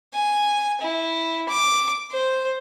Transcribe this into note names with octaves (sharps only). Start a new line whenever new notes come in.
G#5
E4
D6
C5